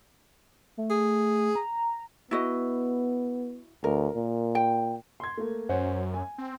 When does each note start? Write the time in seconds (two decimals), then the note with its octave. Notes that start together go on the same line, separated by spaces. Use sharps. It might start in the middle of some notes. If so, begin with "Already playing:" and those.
0.77 A3
0.90 G#4
1.55 A#5
2.31 B3 E4 F#4 D#5
3.84 D2 A#4
4.15 A#2
4.55 G5
5.20 C6 G#6
5.37 A3 A#3
5.69 F#2 C#4 C5 F#5
6.14 G#5
6.38 C4